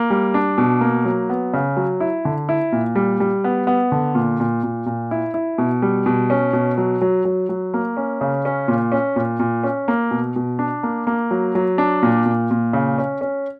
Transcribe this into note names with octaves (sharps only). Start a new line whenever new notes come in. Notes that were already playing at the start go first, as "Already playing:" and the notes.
Already playing: A#3
G3
D4
B2
A#3
F#3
B3
C#3
F#3
E4
D3
E4
A#2
G3
G3
B3
B3
D3
A#2
A#2
A#2
A#2
E4
E4
B2
G3
B2
C#4
B2
F#3
F#3
F#3
F#3
A#3
C#4
C#3
C#4
A#2
C#4
A#2
A#2
C#4
A#3
B2
B2
D4
A#3
A#3
F#3
F#3
D4
A#2
A#2
A#2
C#3
C#4
C#4